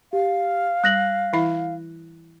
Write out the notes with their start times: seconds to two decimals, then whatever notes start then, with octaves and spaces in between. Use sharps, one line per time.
0.13 G4 F5
0.84 G3 F#6 A#6 F#7
1.33 E3 E4 E5